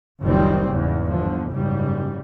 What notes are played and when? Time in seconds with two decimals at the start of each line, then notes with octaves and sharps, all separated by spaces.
0.22 F#1 C#2 D#3 F3 G3 C4
0.68 E2 G#2 C#3
1.06 G1 D3 F3
1.50 F#1 G#2 C#3 G3